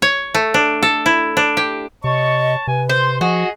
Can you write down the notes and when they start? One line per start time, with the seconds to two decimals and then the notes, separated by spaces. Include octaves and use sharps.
0.02 C#5
0.34 A3
0.54 D4
0.83 A4
1.06 E4
1.37 D4
1.57 G4
2.04 C3 C#5 D#5 A5 C#6
2.67 C3 B4 G#5
2.89 C5 C6
3.21 F3 F#4 G#4 D#5